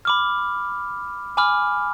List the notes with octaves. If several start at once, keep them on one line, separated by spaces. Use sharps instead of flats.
B5 D6 F6
G#5 B5 D6 F6